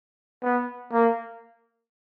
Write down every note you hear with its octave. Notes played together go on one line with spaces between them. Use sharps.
B3
A#3